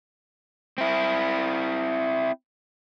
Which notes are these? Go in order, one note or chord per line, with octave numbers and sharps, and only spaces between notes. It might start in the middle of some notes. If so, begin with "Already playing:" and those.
C4 E4